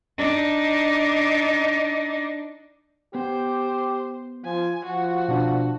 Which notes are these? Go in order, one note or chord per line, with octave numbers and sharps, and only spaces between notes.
D4 D#4
B3 G4 C5
F3 G#5
F3 F#4
B2 D4